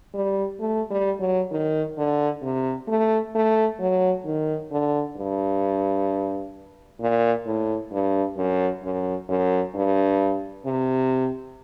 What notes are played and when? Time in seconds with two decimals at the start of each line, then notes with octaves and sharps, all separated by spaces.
0.14 G3
0.60 A3
0.90 G3
1.20 F#3
1.51 D#3
1.97 D3
2.42 C3
2.88 A3
3.35 A3
3.80 F#3
4.25 D#3
4.71 D3
5.17 G2
7.00 A#2
7.46 A2
7.92 G2
8.37 F#2
8.83 F#2
9.29 F#2
9.75 G2
10.65 C3